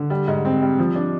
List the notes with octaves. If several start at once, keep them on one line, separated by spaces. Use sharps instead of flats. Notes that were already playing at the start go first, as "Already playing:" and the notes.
Already playing: D3
G3
G#2
C4
G3
F3
D4